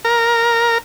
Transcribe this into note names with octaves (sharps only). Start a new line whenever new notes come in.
A#4